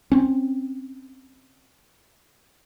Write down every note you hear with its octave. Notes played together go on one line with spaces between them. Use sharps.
C4 C#4